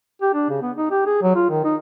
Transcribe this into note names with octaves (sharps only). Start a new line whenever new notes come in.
G4
D4
C#3
B3
D#4
G4
G#4
F#3
F4
D#3
D#4